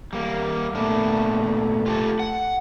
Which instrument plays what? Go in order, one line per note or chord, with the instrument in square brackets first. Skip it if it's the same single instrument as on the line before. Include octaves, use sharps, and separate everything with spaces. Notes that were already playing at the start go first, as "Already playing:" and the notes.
[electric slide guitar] G3 A#3
[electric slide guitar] A#2 B3 D4 [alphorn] A3
[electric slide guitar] F4 G4 A4
F#5